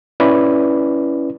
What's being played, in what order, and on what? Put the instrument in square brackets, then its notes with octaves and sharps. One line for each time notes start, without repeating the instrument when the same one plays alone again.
[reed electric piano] C#4 E4 B4 D5